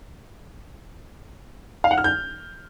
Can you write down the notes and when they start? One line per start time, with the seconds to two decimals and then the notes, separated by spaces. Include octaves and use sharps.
1.84 F5
1.91 F#5
1.98 F6
2.04 G6